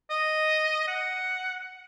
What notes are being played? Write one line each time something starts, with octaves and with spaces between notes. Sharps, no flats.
D#5
F#5